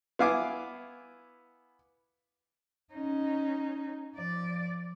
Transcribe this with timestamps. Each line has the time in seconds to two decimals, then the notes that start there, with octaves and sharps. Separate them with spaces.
0.19 B3 E4 F5 G#5 D6
2.93 C#4 D#4
4.15 F3 D5